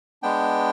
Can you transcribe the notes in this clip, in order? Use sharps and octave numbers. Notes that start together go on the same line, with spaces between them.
G#3 B3 D4 G5